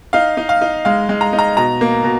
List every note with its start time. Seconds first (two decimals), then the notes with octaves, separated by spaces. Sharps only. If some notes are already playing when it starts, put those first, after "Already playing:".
0.13 D#4 F5
0.37 D#4
0.49 F5
0.61 D#4
0.85 G#3 F5
1.09 G#3
1.21 A#5
1.33 D#4
1.39 A#5
1.57 B2 A#5
1.81 A#3
2.04 B2